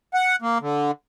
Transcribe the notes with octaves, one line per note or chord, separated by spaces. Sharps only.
F#5
A#3
D3